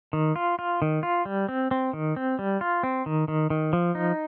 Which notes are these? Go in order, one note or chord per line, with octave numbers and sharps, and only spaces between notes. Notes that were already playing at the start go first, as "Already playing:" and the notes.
D#3
F4
F4
D#3
F4
G3
C4
C4
D#3
C4
G3
F4
C4
D#3
D#3
D#3
F3
D#4